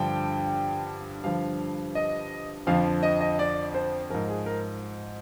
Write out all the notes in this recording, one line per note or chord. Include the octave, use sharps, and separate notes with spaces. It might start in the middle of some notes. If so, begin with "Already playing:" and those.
Already playing: G2 D3 F3 G5
G2 D3 F3 F5
D#5
F2 D3 F3 F5
D#5
D#5
D5
C5
G#2 F3 A#4
G#4
A#4